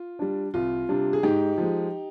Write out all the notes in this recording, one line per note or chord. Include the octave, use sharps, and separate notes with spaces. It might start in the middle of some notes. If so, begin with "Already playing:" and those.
Already playing: F4
G3 D4
C2 F4
C3 G3 D4
G#4
G#2 D#4 G4
F3 G#3